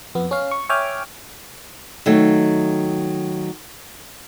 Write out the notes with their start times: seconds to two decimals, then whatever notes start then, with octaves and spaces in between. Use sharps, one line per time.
0.15 F2 B3
0.31 C#4 F5
0.51 C#6
0.69 C#5 E5 G5 G#5 D6 F6
2.06 D#3 F#3 A3